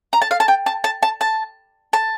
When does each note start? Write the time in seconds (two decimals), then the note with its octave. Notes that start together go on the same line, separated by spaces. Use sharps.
0.13 A#5
0.22 A5
0.31 F5
0.40 A5
0.48 G5
0.66 A5
0.84 A5
1.03 A5
1.21 A5
1.93 A5